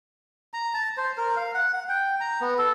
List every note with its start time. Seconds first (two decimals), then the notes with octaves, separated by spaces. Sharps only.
0.54 A#5
0.74 A5
0.97 C5
1.18 A#4
1.37 F5
1.54 F#5
1.73 F#5
1.89 G5
2.21 A#5
2.41 B3
2.58 A4